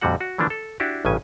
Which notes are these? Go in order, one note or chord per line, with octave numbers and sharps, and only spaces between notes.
F2 A#2 D3 G3 F#4 F#5
F#4
D3 E3 F3 A#3 D4
A4
D4 E4 F#4 G4
A1 G2 C#3 C#4 G#5